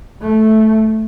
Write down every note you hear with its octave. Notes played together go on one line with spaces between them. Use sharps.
A3